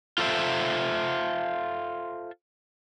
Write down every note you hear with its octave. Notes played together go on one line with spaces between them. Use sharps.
F4 A4 C5 E5